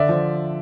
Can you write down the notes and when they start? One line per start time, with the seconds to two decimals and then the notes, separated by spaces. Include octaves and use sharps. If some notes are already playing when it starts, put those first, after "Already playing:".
Already playing: D3 D5 E5
0.09 F3